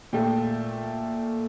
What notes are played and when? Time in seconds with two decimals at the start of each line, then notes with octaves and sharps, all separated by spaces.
0.13 A#2 A3 G5